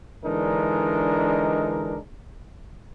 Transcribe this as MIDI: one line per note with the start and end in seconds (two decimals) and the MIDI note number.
0.24 1.97 50
0.24 1.97 52
0.24 1.97 56
0.24 1.97 62
0.24 1.97 63
0.24 1.97 70